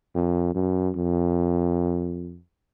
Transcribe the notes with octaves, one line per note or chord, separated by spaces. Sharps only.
F2
F#2
F2